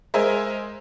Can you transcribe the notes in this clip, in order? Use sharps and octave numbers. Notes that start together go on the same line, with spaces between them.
G#3 A#4 C5 E5 G#5